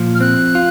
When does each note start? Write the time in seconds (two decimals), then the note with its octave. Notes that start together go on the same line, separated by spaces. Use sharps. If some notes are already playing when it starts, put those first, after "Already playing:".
Already playing: A#2 F3
0.15 F6
0.20 C4 F#6
0.55 F4